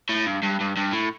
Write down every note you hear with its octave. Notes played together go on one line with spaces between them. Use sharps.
A2
G2
G2
G2
G2
A2